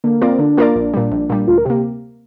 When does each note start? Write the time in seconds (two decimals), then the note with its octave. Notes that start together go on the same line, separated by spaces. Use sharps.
0.04 D3 A#3
0.22 A#3 C4 F4 A#4 D5
0.39 D3 D4
0.57 A#3 F4 A#4 D5
0.75 A#1
0.94 A#2 G3
1.12 A#1
1.30 A#2 G3
1.47 D2 F4
1.58 A#4
1.65 C3 A#3 G4